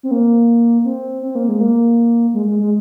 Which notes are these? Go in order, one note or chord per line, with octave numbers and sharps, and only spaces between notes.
C4
A#3
C4
C4
A#3
G#3
A#3
G#3
G#3
G#3